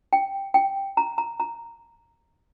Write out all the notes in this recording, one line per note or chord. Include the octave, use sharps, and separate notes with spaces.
G5
G5
A#5
A#5
A#5